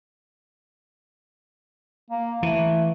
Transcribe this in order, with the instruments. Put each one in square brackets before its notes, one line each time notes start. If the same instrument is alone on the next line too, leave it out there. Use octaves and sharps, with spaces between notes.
[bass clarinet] A#3
[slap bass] E3 [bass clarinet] A3